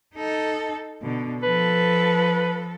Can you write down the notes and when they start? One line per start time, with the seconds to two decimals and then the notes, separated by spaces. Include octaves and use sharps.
0.16 D#4 A4
1.02 B2 D3
1.43 F3 A4 B4